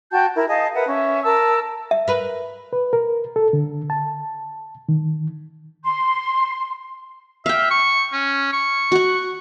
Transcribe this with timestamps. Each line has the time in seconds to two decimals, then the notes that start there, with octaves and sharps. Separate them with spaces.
0.12 F#4 G5 A5 G6
0.35 E4 A#4
0.48 G#4 D#5 F5 A5
0.74 A#4 B4 E5 F#5
0.87 C#4 E5
1.24 A#4 A5 E6
1.91 E5
2.08 A#4 B4
2.73 B4
2.93 A#4
3.36 A4
3.53 D3
3.90 A5
4.89 D#3
5.84 C6
7.46 E5 F5 G5
7.71 C#6
8.13 C#4
8.53 C#6
8.92 F#4 F#5